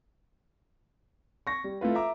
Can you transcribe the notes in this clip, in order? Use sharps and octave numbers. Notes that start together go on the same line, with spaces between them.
C#6 A#6
G3
A3 E4 F4 B4
E5 A#5 D6